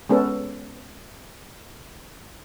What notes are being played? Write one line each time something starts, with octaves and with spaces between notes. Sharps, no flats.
G#3 B3 C#4 A4